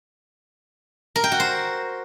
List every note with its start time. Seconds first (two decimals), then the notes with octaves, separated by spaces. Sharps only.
1.16 A#4
1.24 G5
1.32 F#4
1.40 C5